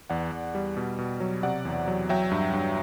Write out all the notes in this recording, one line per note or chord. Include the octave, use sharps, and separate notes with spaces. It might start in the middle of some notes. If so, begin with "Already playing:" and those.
E2 D5 F#5
E2
G3
B2
B2
F#3
C3 D5 F#5
E2
F#3
F#3 E5 G5
G2
G2